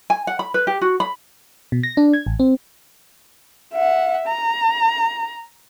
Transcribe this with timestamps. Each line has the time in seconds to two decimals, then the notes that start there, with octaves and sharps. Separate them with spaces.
0.10 G#5
0.27 F#5
0.39 B5
0.54 B4
0.67 G4
0.81 F#4
1.00 B5
1.72 B2
1.83 A#6
1.97 D4
2.13 G#6
2.26 A1
2.40 C4
3.73 E5 F#5
4.28 A#5